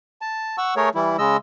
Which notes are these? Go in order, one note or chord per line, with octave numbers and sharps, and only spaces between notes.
A5
F#5 C#6 E6
A3 G#4 A#4 C#5
E3 G3 E4
C#3 G#3 D#5 E6